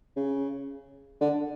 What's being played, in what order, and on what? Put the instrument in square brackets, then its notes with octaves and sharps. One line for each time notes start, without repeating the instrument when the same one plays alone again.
[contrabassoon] C#3
D3